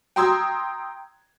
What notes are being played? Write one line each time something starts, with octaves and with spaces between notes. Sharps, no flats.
G5 A#5 C6 D#6 E6 G#6